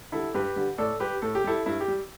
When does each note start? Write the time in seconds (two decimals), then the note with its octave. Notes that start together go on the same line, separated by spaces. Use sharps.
0.12 D3 G3 E4 A4
0.34 G2 G4 B4
0.56 D3 G3
0.78 A2 A4 D5
1.00 G3 G4 B4
1.22 A2 A4
1.35 G4
1.44 G3 E4 A4
1.66 G2 E4
1.80 G4
1.88 G3